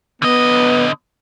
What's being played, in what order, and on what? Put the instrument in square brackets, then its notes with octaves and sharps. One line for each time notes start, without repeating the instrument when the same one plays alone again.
[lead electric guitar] D3 D#5 [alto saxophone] B3